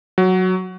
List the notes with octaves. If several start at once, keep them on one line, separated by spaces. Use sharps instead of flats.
F#3